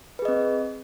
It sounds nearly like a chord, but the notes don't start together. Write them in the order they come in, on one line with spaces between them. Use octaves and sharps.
B4 G#4 D#5 C4